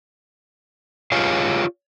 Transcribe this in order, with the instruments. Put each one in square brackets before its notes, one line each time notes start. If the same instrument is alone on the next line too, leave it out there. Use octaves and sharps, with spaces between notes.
[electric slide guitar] F4 G4 G#4 C#5 F5